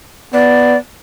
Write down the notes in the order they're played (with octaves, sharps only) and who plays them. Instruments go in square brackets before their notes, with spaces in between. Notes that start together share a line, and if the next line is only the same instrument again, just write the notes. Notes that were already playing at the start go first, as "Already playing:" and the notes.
[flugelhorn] B3 [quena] D5